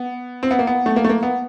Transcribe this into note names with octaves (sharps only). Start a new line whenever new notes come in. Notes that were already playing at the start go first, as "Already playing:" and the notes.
Already playing: B3
C4
B3
A#3
B3
A3
A#3
A3
A#3
B3